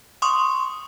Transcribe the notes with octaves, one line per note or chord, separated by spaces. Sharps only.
C6 C#6 D#6